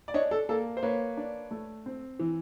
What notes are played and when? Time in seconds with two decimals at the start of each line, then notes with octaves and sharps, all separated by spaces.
0.08 D5
0.14 D4 C#5 D#5
0.31 A4
0.49 A#3 A4
0.77 C5
0.83 A#3 B4 C#5
1.17 D4
1.51 A3
1.86 C4
2.19 E3